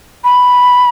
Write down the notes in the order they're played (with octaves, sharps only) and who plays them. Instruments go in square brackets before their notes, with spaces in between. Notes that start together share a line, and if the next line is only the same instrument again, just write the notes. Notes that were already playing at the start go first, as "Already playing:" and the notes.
[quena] B5